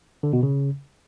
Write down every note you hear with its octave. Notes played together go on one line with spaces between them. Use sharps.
D3
B2
C#3